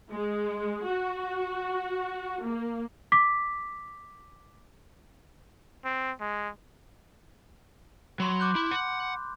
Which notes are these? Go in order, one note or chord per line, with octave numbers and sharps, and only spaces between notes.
G#3
F#4
A#3
D6 B6
C4
G#3
F#3 B5 C6
D6 F#6 G6
E4 B5
F#5